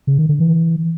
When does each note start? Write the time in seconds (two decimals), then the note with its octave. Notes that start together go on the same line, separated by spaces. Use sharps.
0.07 C#3
0.18 D#3
0.29 D3
0.40 E3